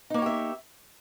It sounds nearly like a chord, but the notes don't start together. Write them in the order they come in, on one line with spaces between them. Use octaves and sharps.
D#4 A#3 C#5 G4 E5